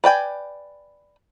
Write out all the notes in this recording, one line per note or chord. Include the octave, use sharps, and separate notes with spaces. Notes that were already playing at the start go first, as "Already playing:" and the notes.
B4 D5 G5 G#5